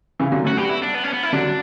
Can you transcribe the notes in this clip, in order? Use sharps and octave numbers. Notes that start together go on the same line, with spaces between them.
C#3 E3
D3 F#3
A3 C#4 F#4
G3 B3 G4
F#4
E4
D4
B3
C#4
B3
E4
D3 F#3 D4
F#3